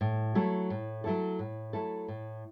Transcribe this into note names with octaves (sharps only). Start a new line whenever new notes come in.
A2
F#3 A3 E4 A4
A2
F#3 A3 E4 A4
A2
F#3 A3 E4 A4
A2